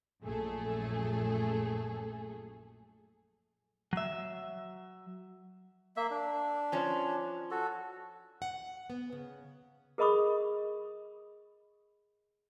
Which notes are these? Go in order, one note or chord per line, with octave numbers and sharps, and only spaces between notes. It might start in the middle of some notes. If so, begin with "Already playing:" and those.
A#1 F#2 A3 G#4 A4
F#3 E5
A#3 E5
D4
F3 C#4
F#4 A4
F#5
B3
C#3
G#4 A#4 D#5 B5 C#6 D#6